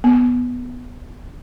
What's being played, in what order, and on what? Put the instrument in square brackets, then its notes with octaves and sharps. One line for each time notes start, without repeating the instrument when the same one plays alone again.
[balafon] B3